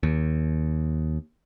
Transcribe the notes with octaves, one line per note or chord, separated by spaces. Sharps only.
D#2